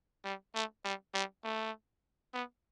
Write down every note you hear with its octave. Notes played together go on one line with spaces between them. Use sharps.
G3
A3
G3
G3
A3
B3